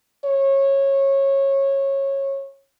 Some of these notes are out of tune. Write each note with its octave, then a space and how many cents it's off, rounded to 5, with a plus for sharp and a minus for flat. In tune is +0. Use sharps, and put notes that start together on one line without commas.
C#5 -20